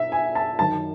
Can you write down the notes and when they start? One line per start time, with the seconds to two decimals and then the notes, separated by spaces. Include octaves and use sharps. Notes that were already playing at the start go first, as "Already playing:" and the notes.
Already playing: B2 E5
0.12 G#5
0.35 A5
0.59 F#2 D#3 A5